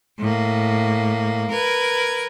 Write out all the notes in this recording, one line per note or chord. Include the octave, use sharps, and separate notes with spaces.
A2 A#3
A#4 B4 G#6